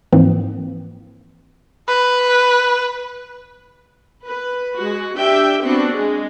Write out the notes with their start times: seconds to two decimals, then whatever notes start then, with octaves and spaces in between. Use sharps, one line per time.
0.13 G#2 E3 F3 A#3 C4
1.88 B4
4.27 B4
4.76 G#3 F#4
5.17 D4 G4 E5 G5
5.63 B3 C4 D4 F#4
5.93 G#3